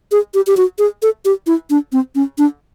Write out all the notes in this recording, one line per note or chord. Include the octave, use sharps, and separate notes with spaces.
G#4
G4
G4
F#4
G#4
A4
G4
E4
D4
C4
C#4
D4